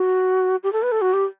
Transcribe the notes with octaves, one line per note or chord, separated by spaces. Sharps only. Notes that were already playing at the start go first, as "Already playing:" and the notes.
Already playing: F#4
G4
A4
B4
A4
F#4
G4